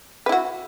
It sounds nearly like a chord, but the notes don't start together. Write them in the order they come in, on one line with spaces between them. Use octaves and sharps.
B4 E4 F#4